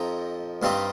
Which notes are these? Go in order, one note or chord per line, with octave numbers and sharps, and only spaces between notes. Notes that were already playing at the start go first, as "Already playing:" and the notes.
Already playing: F2 F3 D#4 A#5
G2 G3 C4 D#4 F5